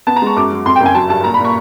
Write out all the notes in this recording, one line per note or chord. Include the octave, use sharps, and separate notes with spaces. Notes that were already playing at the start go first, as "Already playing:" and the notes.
B3 A5
A#5
G#3 C#6
F#2 D6
F#3
F2 C6
G5
F#1
G#5
F#3 A5
G2 A5
A#2 A#5
B5
A#2
C#6